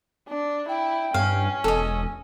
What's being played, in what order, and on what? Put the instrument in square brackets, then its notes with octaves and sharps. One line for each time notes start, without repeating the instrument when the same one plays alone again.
[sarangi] D4
[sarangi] E4 [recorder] G5
[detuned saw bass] G2 [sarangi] C#4 [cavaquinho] F5
[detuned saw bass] E1 [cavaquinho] A4 D#5 [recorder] G#5